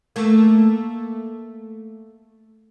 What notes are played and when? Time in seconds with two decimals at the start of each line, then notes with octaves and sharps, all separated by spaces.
0.16 A3 A#3